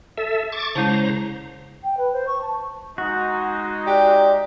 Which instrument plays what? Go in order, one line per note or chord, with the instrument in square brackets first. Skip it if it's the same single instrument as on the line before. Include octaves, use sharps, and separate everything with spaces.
[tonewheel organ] A4 E5
C#6 D6 A6
[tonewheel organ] C#3 C5 A#5 [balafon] G#3 E4 A5
[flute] G5
B4
C5
C#6
A5
[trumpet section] G#3 D#4 [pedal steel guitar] F#4
[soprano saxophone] G4 [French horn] D5